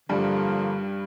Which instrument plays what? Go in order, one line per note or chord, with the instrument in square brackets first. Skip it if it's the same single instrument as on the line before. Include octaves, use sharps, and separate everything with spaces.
[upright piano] G2 G3 [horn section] D3 F3 A#3